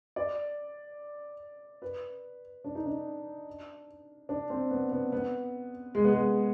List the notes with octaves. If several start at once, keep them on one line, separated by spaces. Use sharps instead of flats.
D5
B4
D4
D#4
D4
D4
C4
B3
B3
B3
G#3
B3
G#3